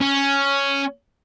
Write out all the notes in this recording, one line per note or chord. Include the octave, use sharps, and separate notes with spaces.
C#4